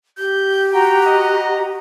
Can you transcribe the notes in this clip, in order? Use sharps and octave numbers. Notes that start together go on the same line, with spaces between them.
G4 G6
F#4 G5 A#5
D#5